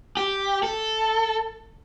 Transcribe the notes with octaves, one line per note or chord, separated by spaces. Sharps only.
G4
A4